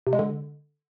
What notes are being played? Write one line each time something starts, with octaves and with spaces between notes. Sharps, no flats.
C3
G#3
D3